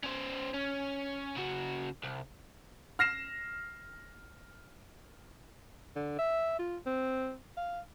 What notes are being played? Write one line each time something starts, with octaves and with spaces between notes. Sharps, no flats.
C#4 C5
C#4
C#3 F#4
C2
F6 A#6 C7 E7
D3
E5
F4
C4
F5